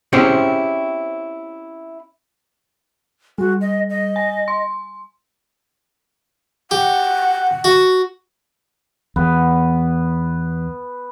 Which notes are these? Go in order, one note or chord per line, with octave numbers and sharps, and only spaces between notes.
C4 C#4 E4 G4 G#4 C5
G3 F#4
D#5
D#5
G#5
C6
G4 F#5
F#4
E2 B3